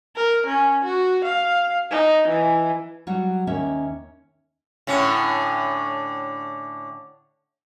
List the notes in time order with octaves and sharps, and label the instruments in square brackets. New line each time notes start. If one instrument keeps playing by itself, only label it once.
[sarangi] A#4
C#4
F#4
F5
D#4
E3
[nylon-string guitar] F#3 G3 F#4
D#2 C#4 E5
[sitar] A2 D3 C#4